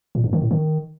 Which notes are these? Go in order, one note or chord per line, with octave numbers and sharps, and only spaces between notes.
A#2
G2
D#3
A2
D#3